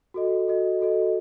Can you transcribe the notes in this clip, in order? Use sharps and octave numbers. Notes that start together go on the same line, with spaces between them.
F#4 A4 D#5
F#4 A4 D#5
F#4 A4 D#5